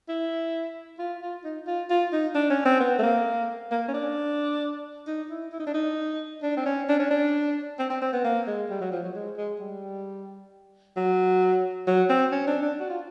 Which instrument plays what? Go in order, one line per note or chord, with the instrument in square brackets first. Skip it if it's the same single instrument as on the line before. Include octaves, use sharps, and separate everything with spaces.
[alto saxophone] E4
F4
F4
D#4
F4
F4
D#4
D4
C#4
C4
B3
A3
A#3
A#3
C#4
D4
D#4
E4
E4
D#4
D4
D#4
D4
C4
C#4
D4
C#4
D4
C4
C4
C4
B3
A#3
G#3
G3
F#3
F3
F#3
G#3
G#3
G3
F#3
F#3
C4
C#4
D4
D4
F#4
F4